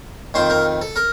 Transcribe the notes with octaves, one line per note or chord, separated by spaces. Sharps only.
F2 D#3 C5
A#4
A4
A#4